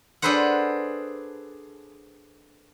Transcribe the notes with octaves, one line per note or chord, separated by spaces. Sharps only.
D4 G#4 A4 B4 C5 F#5